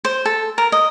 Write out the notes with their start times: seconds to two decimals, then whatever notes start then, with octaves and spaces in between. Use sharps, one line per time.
0.05 C5
0.25 A4
0.58 A#4
0.72 D#5